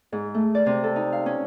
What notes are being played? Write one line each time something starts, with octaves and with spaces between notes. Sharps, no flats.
G#2
A3
D5
C3
A4
D#4
F5
C#4